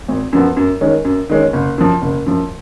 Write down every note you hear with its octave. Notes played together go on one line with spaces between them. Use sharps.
G#1
F#2 F3 B3
F#2
D#3 G#3 C#4
F#2
D#3 G#3 C#4
F#1
F#2 F3
F#1
F#2 F3